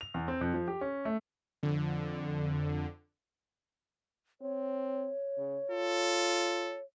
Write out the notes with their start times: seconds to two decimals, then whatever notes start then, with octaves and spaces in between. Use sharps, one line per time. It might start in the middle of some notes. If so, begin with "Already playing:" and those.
0.01 F7
0.14 E2
0.28 C4
0.41 F2
0.54 F3
0.68 G4
0.81 C#4
1.05 A3
1.63 F2 D3
4.41 C4 C#5
5.37 C#3
5.70 F4 A4